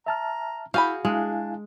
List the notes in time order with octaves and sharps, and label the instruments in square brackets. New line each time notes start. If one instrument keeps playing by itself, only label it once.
[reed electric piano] E5 A5 F6 [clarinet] A#5
[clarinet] E4 [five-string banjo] F#4 G#4 B5 [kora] F5 [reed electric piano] G6
[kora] G#3 [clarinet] D4 [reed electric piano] E4 F5 G#5